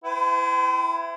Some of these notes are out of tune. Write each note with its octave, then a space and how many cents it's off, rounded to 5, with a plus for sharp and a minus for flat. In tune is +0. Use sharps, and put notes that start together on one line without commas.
E4 +20 C5 -45 G5 -25